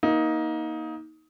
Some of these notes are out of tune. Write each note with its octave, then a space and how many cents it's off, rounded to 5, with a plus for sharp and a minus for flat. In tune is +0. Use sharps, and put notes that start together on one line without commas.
A#3 +20 D#4 +20